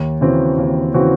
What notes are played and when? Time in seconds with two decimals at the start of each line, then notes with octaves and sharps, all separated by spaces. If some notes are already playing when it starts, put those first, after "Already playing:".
Already playing: D#2
0.21 C#3 E3 C4 F#4
0.58 D#2
0.94 C#3 E3 C4 F#4